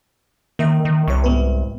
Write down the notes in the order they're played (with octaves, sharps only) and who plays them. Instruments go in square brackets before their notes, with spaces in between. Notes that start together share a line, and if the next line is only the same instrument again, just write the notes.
[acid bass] D#3 [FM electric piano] A#3 E5
[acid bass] D#3
[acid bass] C2 [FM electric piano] C#5 C#6
[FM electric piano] G#2 B3 B4